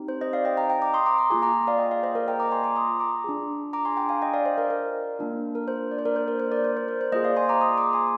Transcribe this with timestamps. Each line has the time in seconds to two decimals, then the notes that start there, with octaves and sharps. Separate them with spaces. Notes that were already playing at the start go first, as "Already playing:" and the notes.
Already playing: C4 D#4 G4
0.08 C5
0.21 C5 D#5
0.33 D5 F5
0.45 D#5 G5
0.57 G5 A#5
0.70 G5 A#5
0.82 A#5 D6
0.93 C6 D#6
1.06 A#5 D6
1.18 A#5 D6
1.30 A#3 F4 G#4 G#5 C6
1.42 A#5 D6
1.67 D5 F5
1.78 D#5 G5
1.91 D5 F5
2.03 C5 D#5
2.15 A#4 D5
2.28 G5 A#5
2.40 A#5 D6
2.51 G#5 C6
2.64 A#5 D6
2.76 C6 D#6
3.00 A#5 D6
3.24 D4 F4 G#4
3.73 A#5 D6
3.85 G#5 C6
3.97 G5 A#5
4.09 F5 G#5
4.22 D#5 G5
4.33 D5 F5
4.46 C5 D#5
4.58 A#4 D5
4.70 A#4
5.19 A#3 D4 F4
5.55 A#4
5.68 C5
5.91 D5
5.99 C5
6.05 A#4 D5
6.16 C5
6.28 A#4
6.40 C5
6.52 A#4 D5
6.64 C5
6.77 C5
6.88 A#4
7.01 C5
7.12 A#3 F4 G#4 C5 D#5
7.24 D5 F5
7.37 G#5 C6
7.49 A#5 D6
7.61 C6 D#6
7.77 A#5 D6
7.93 G#5 C6